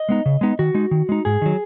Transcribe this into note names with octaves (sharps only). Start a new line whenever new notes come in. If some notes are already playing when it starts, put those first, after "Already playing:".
Already playing: D#5
G#3 B3 D#4
C#3
G#3 B3 D#4
D#3 F#4
G#3 D#4
D#3
G#3 D#4
G#2 G#4
D#3 F#3